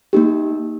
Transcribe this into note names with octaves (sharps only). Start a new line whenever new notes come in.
A#3 D#4 G4